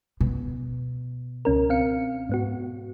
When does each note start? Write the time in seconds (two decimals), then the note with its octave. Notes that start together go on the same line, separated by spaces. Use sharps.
0.21 B2
1.45 C#2 C#4 A#4
1.70 C4 F5 C#7
2.29 G#2 B3 F#4